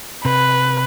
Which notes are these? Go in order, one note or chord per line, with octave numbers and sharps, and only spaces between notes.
C3 B4